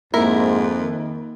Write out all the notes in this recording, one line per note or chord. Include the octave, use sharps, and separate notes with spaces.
F2 G#2 A#3 E4 A#4
D#3